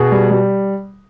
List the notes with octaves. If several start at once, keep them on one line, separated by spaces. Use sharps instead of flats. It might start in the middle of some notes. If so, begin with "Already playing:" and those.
Already playing: B2 F#4 G#4
G3
G3